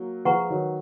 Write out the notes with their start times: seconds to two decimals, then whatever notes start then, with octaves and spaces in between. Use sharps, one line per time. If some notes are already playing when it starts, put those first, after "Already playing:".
Already playing: F#3 A#3
0.25 F3 G#3 B4 F#5 A#5 C#6
0.50 D#3 F#3